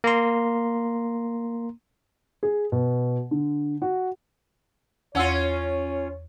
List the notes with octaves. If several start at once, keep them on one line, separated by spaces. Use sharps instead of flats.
A#3 A#5 C6
G#4
B2
D3
F#4
E2 C#4 F4 C#5 F#5 E6